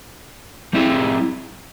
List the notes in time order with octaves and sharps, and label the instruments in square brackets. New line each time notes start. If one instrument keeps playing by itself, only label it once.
[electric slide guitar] G3 C4 E4 G#4